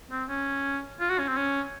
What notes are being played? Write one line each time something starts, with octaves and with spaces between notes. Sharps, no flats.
C4
C#4
F4
F#4
C#4
C4
C#4